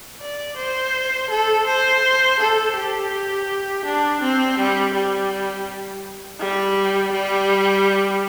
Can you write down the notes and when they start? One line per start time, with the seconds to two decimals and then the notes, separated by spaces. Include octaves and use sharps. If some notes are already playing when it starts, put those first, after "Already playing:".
0.21 D5
0.57 C5
1.30 A4
1.67 C5
2.40 A4
2.76 G4
3.85 D4
4.22 C4
4.58 G3
4.94 G3
6.39 G3
7.13 G3